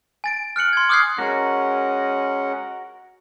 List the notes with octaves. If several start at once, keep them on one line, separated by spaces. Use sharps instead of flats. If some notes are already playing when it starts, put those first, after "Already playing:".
G#5 A6 D7
F6 F#6 C#7 F#7
C6 G#6
D6 D#6 F6 F#6 G#6 C7
G#3 C#4 F#4 A#4 F#5